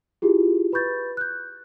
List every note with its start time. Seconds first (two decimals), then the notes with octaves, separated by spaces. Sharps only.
0.22 E4 F4 G4 G#4
0.73 B4 B5 C#6 G6 A6
1.17 F#6 G6